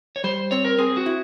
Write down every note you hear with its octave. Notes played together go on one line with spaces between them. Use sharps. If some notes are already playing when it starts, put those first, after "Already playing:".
C#5
G3 C5
C4 C#5
A#4
C4 G#4
F#4
E4